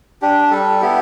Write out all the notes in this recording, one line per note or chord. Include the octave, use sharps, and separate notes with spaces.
D4 G4
G3 A4
B3 E4 G4